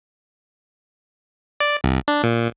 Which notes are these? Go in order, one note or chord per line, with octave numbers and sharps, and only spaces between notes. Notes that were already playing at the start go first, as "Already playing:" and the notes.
D5
C2
D4
A#2